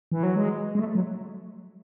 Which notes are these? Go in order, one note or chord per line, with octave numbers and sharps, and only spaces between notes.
E3
F#3
G#3
G#3
A3
F#3